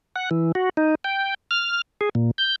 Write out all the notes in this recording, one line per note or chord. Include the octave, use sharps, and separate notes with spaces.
F#5
E3
F#4
D#4
G5
F6
G#4
A#2
G6